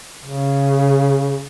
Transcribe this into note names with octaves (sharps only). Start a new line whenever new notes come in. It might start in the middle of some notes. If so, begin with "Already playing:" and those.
C#3